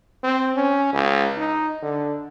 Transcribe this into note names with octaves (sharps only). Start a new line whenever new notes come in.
C4
C#4
C#2
D#4
D3